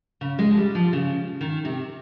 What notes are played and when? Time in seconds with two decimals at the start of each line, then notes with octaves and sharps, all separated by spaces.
0.21 C#3
0.39 G#3
0.51 F3
0.57 G3
0.75 F3
0.93 C#3
1.41 D#3
1.65 C3